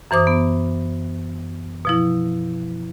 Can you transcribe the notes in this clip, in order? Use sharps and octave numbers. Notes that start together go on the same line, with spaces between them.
F#2 E3 C5 D6 D#6
B3
B2 F3 E4